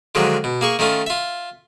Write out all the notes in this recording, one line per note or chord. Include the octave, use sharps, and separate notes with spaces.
D3 D#3 F3 F#3 G#3
B2
A#3 G#4 C#6
D#3 A3 C#4 F4
F4 E5